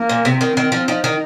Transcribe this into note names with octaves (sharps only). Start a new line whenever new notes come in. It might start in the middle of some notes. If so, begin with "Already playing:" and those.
Already playing: A#3
A#2
C3 C4
D#3
D#3 C4
F3
F3 D#4
D#3